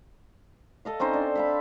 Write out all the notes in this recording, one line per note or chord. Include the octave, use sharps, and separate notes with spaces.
A4 D#5 F5
C4 C#4 D#4 C5
D4
E5 F5 B5